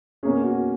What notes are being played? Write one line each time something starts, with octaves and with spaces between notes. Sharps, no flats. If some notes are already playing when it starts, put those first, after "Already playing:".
B2 A#3 C#4 G#4
F#4